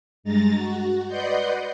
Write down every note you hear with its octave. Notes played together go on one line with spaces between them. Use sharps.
G2 G#3 A#5 A6 A#6
F#4
B4 D5 D#5 F#5 C6 G6